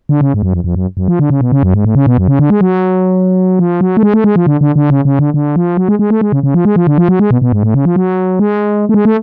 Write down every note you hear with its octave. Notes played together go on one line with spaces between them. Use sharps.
D3
C#3
G#2
F#2
F2
F2
F#2
F#2
F3
D3
C#3
B2
C#3
F#2
G#2
A2
C#3
B2
F#2
C#3
D3
G#3
F#3
F3
F#3
A3
G#3
A3
G#3
F3
D3
D3
D3
C#3
C#3
D3
D3
F3
F#3
G#3
G#3
A3
G#3
C#3
C#3
F3
G#3
F3
D3
F3
F#3
G#3
B2
B2
G#2
A2
C#3
F3
F#3
G#3
A3
G#3
A3